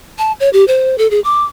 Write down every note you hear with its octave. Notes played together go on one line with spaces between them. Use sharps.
A5
C#5
G4
C5
A4
G#4
D6